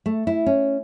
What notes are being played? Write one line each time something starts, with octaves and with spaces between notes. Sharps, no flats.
A3
E4
C#4